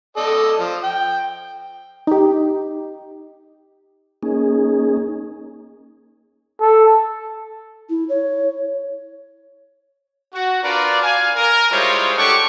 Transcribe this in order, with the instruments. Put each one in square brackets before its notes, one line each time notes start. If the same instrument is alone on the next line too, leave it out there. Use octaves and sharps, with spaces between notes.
[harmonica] A4 D5 D#5
F3
G5
[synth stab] D#4 G4
[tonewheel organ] A#3 C#4 D#4 G#4
[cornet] A4
[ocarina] E4
C#5
[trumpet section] F#4
D4 F4 A#4 B4 D5
F5 G#5
A#4
G3 G#3 E4 F4 C5 C#5
D4 G4 A4 F#5 C#6 D6